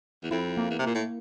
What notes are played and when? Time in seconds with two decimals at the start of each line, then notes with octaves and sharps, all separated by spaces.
0.23 E2
0.31 F2 E4
0.57 A#3
0.70 E2
0.79 C3
0.84 A#2 A#3
0.95 A2